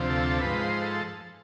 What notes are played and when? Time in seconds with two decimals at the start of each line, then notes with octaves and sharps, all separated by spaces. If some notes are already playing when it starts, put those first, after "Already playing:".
Already playing: D2 C3 F3
0.10 A4
0.41 G#2 F3 B4
0.61 C5
0.82 A4